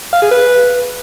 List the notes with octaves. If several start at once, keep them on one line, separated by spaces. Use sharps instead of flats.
F5
G#4
B4